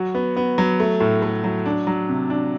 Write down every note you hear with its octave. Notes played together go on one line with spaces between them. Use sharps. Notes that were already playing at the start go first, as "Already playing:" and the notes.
Already playing: F#3 F#4
B3
B3
F#3
A3
A2
A3
F#3
D4
F#3
C3
D4